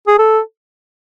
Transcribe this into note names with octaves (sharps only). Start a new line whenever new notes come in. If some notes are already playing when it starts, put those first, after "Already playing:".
G#4
A4